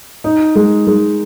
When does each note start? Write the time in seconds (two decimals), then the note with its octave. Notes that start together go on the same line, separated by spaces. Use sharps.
0.24 D#4
0.55 G#3
0.87 G#3